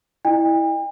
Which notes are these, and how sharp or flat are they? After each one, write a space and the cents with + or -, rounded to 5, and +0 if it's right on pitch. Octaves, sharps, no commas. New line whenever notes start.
E4 -10 D#5 -45 G5 +45